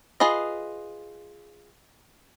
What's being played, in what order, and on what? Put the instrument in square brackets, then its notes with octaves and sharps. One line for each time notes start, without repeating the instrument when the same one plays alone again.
[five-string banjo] F4 G#4 B4 D#5